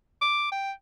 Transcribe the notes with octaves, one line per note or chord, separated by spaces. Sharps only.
D6
G5